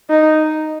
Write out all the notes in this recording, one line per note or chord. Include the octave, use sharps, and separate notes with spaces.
D#4